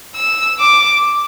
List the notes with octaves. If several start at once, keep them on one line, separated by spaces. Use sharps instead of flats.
E6
D6